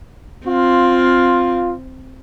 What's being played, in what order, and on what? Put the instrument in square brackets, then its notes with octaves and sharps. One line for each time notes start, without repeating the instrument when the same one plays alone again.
[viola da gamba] C4 [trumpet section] F4